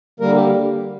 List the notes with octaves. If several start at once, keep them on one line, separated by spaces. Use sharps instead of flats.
D3 G3 A#3 A#4
G4